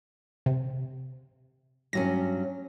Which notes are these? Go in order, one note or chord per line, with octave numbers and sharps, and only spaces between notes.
C3
G2 F#3 C#4 A#6